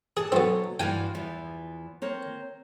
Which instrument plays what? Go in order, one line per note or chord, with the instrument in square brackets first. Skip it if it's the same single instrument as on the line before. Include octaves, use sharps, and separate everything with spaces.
[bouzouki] D4 A4 A5 [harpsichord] G#4
[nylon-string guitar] B2 F#3 F#4 [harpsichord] B3 C4
[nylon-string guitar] G2 E3 [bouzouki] F4 F#4 F5 [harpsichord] G5 G#5
[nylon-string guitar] E2 E3 [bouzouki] F3 B3
[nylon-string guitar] C4 A#4 C#5